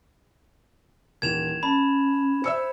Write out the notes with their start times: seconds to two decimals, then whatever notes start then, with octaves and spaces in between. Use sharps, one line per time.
1.22 D#1 E3 G#6 E7 F7
1.63 C#4 A5 B5
2.44 C5 E5 E6 C#7